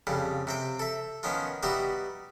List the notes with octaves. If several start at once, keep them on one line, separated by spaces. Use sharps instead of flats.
F2 C#3 G3
C3 C4 G5
A4 E5
D#3 F3 B3 C#4 D#4 F4
G3 B3 D#4 F#4 G4 E5